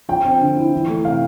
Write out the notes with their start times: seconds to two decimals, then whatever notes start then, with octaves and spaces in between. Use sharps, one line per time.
0.09 F3 G5
0.25 C4
0.41 D3
0.57 E4
0.72 E3
0.88 A3
1.05 C3 F5